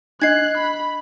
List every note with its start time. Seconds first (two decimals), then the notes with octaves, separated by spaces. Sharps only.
0.22 D4 D#5 F#6 G#6 C7
0.58 B5